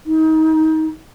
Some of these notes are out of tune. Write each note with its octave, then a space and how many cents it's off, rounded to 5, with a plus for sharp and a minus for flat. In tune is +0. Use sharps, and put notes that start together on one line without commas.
D#4 +25